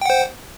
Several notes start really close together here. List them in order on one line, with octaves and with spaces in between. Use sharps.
G5 F#5 C5